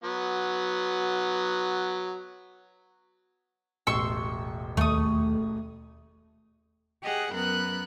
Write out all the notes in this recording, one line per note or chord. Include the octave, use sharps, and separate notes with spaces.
F#3 B3
E1 A1 C6 C#6 E6
D#2 A3 C#6 D#6
G4 G#4 D#5 F#5 G5
F#2 B3 A#4 B5 F#6